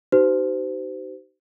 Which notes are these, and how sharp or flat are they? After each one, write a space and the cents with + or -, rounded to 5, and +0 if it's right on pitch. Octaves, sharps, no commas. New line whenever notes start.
D#4 +0 G4 -40 C5 -35